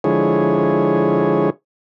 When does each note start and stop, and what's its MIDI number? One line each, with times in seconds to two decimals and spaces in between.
0.04 1.50 50
0.04 1.50 53
0.04 1.50 56
0.04 1.50 64
0.04 1.50 68
0.04 1.50 73